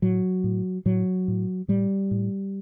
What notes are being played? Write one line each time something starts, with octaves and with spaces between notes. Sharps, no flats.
A2 F#3
A2
A2 F#3
A2
A2 G3
A2